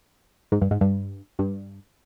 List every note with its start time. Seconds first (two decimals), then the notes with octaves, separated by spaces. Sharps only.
0.52 G#2
0.61 G2
0.71 G#2
0.81 G2
1.39 G2